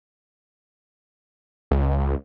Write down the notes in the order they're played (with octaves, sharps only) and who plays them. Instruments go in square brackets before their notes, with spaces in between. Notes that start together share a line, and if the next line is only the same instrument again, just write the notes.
[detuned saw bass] C#2